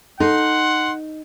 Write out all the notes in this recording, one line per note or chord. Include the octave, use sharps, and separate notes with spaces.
D#4 A4 F#5 C6